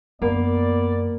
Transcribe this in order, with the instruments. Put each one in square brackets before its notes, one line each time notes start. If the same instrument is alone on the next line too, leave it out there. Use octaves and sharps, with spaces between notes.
[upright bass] F#2 [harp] A#3 [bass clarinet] B3 [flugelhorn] D5